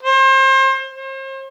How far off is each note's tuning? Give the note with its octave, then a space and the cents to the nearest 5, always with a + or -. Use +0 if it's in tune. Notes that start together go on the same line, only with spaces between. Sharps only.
C5 +35
C5 +40